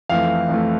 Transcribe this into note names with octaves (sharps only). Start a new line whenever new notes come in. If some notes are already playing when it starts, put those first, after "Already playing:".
F2 E3 A3 F5
F2 E3 A3